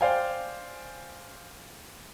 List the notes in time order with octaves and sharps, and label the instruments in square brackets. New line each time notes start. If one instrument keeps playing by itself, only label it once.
[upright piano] C5 D5 F5 G5 G#5